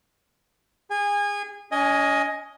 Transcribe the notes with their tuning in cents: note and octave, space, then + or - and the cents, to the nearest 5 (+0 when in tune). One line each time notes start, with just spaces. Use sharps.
G#4 -30 G#5 -25
C#4 +45 D#5 +10 G#5 +0